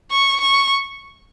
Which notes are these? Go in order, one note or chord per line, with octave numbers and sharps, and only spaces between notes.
C#6
C#6